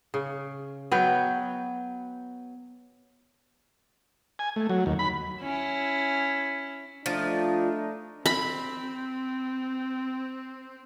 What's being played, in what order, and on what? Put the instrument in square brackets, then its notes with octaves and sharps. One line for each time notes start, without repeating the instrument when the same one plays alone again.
[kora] C#3
F#3 B3 G5
[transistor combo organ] G#5
A3
F#3
D#2
B5
[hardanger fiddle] C#4 E4
[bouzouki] F3 [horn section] A3 D4 D#4
[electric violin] C4 [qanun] B5